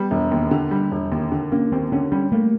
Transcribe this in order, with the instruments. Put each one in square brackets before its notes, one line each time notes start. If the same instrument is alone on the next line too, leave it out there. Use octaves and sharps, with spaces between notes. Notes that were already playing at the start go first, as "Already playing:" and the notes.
Already playing: [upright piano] G3 [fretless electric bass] B3
[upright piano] E1
D#2
D3
G3
E1
D#2
D3
[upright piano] A#3 [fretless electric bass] C#4
[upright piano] D#2 [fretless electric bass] C4
[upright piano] D3 [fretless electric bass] C#4
[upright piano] G3 [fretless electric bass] C#4
[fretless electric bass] A3 [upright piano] A#3